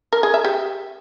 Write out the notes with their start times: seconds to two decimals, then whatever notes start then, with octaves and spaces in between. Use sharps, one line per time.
0.13 A#4
0.23 G#4
0.34 E5
0.44 G4